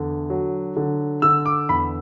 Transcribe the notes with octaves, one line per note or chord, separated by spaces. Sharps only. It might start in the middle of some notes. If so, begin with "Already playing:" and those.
Already playing: E2 D3
F#3
D3
D3 E6
D6
E2 B5